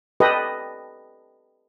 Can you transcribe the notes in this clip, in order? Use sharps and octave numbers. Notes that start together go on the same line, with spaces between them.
G4 A4 B4 D#5